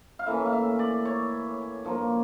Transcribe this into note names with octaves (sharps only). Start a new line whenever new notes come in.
F5
A2 E3 A#3 C#4 E5
F5
E5
D5
C#5
G2 F3 A#3